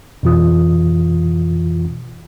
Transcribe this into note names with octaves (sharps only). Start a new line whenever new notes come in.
F2 B2 E3 F4 D#6